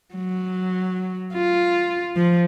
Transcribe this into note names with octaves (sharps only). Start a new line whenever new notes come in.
F#3
F4
F3